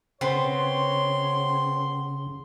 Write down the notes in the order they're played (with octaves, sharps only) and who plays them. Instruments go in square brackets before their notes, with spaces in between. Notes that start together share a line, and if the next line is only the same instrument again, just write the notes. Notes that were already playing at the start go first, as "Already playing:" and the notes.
[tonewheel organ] C#3 [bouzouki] B3 C4 [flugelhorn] C#5 [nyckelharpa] C6